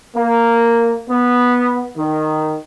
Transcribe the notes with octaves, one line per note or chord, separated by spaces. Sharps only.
A#3
B3
D#3